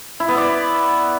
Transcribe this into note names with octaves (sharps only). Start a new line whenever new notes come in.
E4
B3
D5